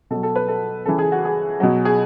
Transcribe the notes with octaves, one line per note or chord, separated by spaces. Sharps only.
B2 F#3 A4
A4
B4
A4
C#3 E3 A4
G#4
F#4
G#4
B2 F#3
G#4